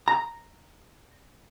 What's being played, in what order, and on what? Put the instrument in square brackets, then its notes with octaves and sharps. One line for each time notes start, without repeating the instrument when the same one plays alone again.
[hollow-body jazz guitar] A#5